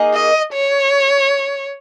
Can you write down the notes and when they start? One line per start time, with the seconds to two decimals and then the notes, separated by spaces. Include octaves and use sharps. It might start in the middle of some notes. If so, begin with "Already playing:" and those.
Already playing: A#3 D#4 G#4
0.14 D#5
0.54 C#5